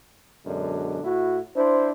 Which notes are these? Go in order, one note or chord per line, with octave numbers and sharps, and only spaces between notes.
F#2 B2 D3 G#3 D4
A2 E4 F#4
D4 E4 C5